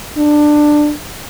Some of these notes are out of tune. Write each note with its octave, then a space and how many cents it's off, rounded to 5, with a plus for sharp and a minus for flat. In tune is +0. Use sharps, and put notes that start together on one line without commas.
D4 +15